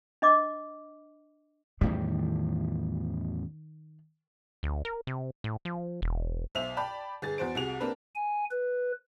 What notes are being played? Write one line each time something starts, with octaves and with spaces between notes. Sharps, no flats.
D4 D#5 D6
E2 A2 D#3 G3
D2
A#4
C3
A2
F3
E1
B1 C5 E5 F7
D5 G5 A5 B5
G1 G#4 A6
E2 F#4 C5 D7
C2 C3 F#4 G#4 F7
A#3 C4 D4 A#4 B4
G#5
B4